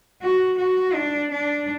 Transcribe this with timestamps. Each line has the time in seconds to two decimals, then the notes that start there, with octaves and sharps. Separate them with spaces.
0.22 F#4
0.58 F#4
0.94 D4
1.31 D4